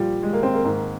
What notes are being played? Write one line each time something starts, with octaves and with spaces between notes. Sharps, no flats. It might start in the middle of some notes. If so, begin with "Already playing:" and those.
Already playing: A#2 F3 G3
G#3
A#3
C4
A#3
G#2 D#3